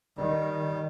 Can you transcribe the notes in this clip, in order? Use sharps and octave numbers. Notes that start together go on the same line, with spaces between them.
D#3 G3